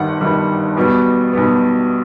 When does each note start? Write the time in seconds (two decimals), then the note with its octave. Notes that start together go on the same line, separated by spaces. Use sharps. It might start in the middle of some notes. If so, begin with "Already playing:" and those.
Already playing: G1 G2 D#3 G3 F#5
0.21 G1 G2 D#3 G3
0.77 B1 B2 G3 B3
1.33 B1 B2 G3 B3